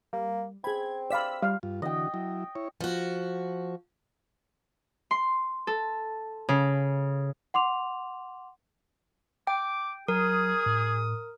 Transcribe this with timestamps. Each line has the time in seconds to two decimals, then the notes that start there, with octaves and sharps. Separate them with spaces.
0.13 G3 A#3
0.64 C4 G#4 B5 G#6
1.10 D5 F5 B5 E6 B6
1.42 G3 F5
1.63 G2 F4
1.82 D3 E3 F#4 D#5 G5
2.14 F#3 E4
2.55 E4 C#5
2.81 F3 F#4
5.11 C6
5.67 A4
6.49 C#3
7.54 F#5 C6 D6 F7
9.47 G5 D6
10.08 F#3 G#4 A#4 D#6
10.66 A2